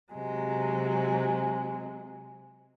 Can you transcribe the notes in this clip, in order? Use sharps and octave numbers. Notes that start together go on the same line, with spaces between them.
C3 F#3 G#3